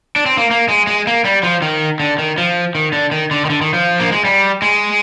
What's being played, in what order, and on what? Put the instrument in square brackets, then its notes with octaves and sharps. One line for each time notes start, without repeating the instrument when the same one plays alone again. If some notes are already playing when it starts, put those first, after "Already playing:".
[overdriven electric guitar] D4
C4
A#3
A#3
G#3
G#3
A#3
G3
F3
D#3
D3
D#3
F3
D#3
D3
D#3
D3
D#3
D3
D#3
F3
A#3
G#3
G3
G#3